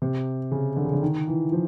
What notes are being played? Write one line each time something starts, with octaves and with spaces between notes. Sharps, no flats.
C3
C#3
D3
C#3
D3
D#3
E3
F3